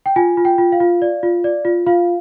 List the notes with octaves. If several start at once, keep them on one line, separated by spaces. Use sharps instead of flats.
G5
F4 G#5
F4
G5
F4
F5
F4
D5
F4
D5
F4
F4 F5